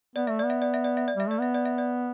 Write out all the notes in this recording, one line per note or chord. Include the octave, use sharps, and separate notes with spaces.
B3 D5
A3 E5
B3 D5
E5
D5
E5
D5
E5
D5
G3 E5
A3 D5
B3 E5
D5
E5
D5